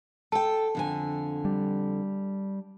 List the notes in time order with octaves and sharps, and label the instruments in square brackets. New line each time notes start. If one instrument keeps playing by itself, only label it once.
[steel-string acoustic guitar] A4 G5 [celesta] A5
[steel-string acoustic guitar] F2 D3 G#5
[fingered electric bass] G3